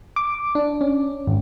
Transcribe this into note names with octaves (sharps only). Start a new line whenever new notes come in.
D6
D4
C#4
G#1